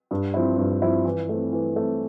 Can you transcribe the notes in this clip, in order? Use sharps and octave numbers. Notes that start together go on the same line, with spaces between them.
G2
F3 C4 E4
G2
F3 C4 E4
E3
A3 C4
E3
A3 C4